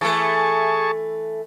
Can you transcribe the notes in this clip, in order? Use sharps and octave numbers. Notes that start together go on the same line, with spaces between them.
E3 A3 G#4 A5 C#6